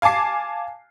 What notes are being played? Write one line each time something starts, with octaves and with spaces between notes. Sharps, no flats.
F5 G#5 A5 D6 C7